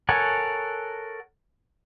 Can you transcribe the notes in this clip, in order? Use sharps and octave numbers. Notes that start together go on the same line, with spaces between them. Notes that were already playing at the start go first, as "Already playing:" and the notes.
A4 A#4 C#5 F#5 G#5